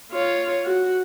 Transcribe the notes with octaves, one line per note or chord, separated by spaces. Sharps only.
F4 C#5
F#4